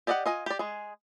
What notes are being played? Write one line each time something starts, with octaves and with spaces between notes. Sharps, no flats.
G4 D5 D#5 F5 F#5
F4 D#5 G#5
G4 D5
G#3 G#4